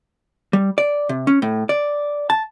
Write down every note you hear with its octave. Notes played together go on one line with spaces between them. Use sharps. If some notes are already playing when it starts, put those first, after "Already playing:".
G3
D5
C3
C#4
A2
D5
A5